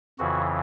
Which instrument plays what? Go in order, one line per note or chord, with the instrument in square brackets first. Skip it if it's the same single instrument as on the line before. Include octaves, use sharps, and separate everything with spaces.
[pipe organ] F2 C#3 E3 F#4